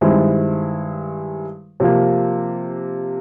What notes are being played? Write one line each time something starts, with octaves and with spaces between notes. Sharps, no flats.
G2 D#3 G#3 C4 E4
C3 F3 A#3